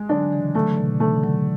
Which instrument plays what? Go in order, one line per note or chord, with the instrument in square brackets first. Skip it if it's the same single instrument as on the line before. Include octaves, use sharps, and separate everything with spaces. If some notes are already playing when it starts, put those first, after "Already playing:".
Already playing: [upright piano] G#3
[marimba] D3 F#3 [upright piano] D4
[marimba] C#3 E3
[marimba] D3 F#3 [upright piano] A3
[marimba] B2 D3
[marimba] C#3 E3 [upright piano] A3
[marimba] D3 F#3